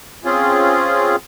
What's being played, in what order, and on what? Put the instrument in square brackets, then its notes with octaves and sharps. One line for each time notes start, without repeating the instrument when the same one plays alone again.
[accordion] C4 C#4 F4 G#4